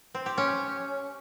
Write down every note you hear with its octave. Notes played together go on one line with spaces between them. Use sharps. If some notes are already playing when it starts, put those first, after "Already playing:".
C4
G4
C#4